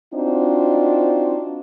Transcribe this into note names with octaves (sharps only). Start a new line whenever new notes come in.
C4 D4 D#4 F4 F#4 C5